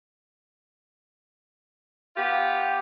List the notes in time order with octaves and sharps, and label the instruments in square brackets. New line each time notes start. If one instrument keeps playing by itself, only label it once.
[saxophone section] B3 F4 G4